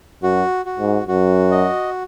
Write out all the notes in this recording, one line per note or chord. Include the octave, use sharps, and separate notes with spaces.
F#2 F#4
F#4
G#2
F#2 F#4
D#5